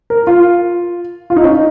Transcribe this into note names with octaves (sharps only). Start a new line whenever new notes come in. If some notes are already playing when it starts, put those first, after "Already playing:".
A#4
F4
F4
D#4
C#4
D#4